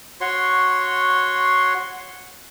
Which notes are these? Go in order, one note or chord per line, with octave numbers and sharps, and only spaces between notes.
F#4 C#5 C6